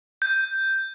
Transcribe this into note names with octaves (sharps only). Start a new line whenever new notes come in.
G6